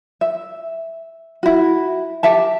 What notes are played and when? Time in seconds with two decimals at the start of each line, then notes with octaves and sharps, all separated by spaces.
0.21 E5
1.43 E4 F#4
2.23 G4 E5 A5